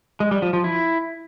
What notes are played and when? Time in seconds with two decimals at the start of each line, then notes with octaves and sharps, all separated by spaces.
0.20 G#3
0.31 G3
0.42 F3
0.53 F3
0.64 E4